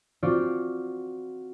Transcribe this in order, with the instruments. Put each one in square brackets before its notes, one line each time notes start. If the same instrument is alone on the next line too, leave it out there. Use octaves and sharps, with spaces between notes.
[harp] C4 F4 F#4 D5